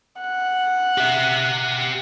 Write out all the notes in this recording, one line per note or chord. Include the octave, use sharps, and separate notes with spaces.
F#5
G4 E5